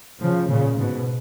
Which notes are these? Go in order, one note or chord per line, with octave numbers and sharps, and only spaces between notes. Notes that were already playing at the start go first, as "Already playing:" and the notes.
C#3 F3
A#2 C#3
G#2 B2